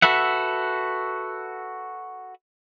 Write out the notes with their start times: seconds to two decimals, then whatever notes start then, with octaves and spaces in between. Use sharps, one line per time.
0.02 F#4 A4 B4 E5 F#5